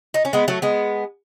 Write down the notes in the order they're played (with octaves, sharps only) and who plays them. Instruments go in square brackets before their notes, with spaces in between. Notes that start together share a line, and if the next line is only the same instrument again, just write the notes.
[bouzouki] D#4
C#4
G#3 B3
F#3 A3
G#3 B3